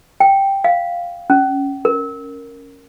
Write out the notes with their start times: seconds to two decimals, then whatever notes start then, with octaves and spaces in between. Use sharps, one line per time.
0.20 G5
0.64 F5
1.30 C#4
1.85 A#4